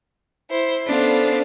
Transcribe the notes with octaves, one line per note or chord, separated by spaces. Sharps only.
E4 C5
B3 C#4 D4 A4 C5 F5